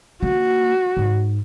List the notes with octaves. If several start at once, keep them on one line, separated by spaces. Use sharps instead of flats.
A#3 F#4
G#2